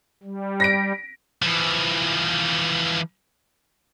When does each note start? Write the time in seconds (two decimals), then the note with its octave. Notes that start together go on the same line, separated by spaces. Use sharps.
0.23 G3
0.60 A#6 B6 D7
1.42 E3 F3